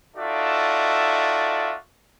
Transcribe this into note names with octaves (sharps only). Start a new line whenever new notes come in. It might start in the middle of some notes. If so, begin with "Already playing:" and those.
D#4 F4 F#4 A4 D5 E5